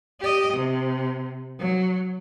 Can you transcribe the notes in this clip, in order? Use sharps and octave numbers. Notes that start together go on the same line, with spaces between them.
G4 D#5
C3
F#3